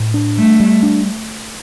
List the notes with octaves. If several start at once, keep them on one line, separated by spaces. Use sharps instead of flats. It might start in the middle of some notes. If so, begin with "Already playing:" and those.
Already playing: A2
D4
G3 A3
G3
D4